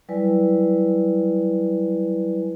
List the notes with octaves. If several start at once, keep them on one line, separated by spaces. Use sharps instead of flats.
F#3 G3 E4 B4 D5 G#5